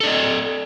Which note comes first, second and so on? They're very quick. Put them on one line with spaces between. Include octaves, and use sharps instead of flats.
A4 D5 D#5